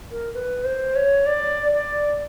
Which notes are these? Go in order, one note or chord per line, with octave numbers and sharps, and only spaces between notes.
A#4
B4
C5
C#5
D5
D5